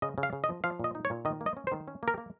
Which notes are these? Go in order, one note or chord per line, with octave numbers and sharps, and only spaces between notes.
C#3 D#5
C#3
F5
C#3
D#5
F3
F3 F5
A#2 D#5
D#4
C#5
A#2
D#3 D#5
A#3
D#5
C#4
C5
D#3
C#4
A#3 A#4
A#3